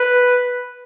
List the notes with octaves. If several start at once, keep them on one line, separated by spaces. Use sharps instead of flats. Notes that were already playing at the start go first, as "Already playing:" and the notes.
Already playing: B4